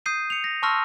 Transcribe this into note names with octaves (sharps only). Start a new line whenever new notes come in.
D#6 G6 C7 D#7
C#7 F7
A#6
A5 C6 C#6 E6 F6 A#6